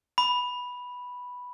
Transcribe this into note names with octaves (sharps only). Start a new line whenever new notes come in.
B5